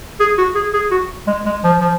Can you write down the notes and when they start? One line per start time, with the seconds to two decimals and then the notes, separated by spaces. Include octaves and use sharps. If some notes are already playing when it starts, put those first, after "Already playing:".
0.20 G#4
0.38 F#4
0.55 G#4
0.74 G#4
0.91 F#4
1.27 G#3
1.46 G#3
1.64 F3
1.80 F3